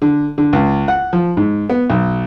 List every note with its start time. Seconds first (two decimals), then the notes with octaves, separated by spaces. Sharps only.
0.02 D3
0.38 D3
0.53 C#2
0.88 F#5
1.13 F3
1.37 G#2
1.70 B3
1.90 B1